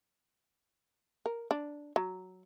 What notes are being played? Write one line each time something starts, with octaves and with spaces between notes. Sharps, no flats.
A#4
D4
F#3